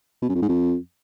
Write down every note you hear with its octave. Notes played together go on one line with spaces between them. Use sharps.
B2
F#2
F2
G#2
F2